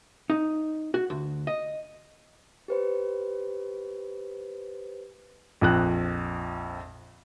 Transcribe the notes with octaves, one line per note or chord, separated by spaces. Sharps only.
D#4
F#4
D2
D#5
G4 B4 C5
A#1 F2 F#6